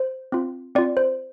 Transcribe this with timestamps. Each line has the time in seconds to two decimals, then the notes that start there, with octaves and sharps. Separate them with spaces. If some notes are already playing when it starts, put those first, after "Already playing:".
Already playing: C5
0.32 C4 F4
0.75 C4 F4 D5
0.97 C5